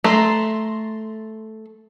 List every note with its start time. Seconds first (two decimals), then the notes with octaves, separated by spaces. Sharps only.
0.04 A3 A#5 C6